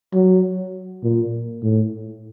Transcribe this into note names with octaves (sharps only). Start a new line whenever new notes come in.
F#3
A#2
A2